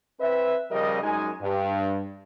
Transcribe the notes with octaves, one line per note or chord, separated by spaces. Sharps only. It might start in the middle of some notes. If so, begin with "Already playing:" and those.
C4 B4 E5
C#3 F3 G3 A#4 D#5
F#2 G#3 D#4 G#5
G2